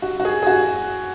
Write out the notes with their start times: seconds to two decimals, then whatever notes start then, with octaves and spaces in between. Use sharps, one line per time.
0.02 F#4
0.20 F#4
0.25 G#4
0.43 G#4
0.47 F#4